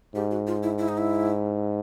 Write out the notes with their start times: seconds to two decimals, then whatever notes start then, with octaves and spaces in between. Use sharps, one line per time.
0.15 G#2 G4
0.31 F#4
0.47 F4
0.63 E4
0.79 E4
0.89 D#4
0.98 E4